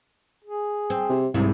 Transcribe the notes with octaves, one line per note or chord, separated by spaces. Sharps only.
G#4
C4
C3
C2 G#2 C3 E4